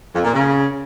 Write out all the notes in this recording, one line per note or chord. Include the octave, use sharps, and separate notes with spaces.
F2
A#2
C#3